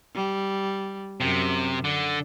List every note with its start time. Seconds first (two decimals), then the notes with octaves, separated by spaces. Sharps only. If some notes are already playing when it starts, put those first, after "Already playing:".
0.15 G3
1.21 F#2 C3
1.84 D3